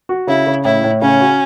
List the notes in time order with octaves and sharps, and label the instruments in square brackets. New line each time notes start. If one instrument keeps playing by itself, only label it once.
[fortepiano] F#4
[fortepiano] C#3 [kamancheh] E4
[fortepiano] C#3
[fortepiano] A2 [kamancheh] E4
[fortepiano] A2
[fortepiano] C#3 [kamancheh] C#4
[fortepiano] F#4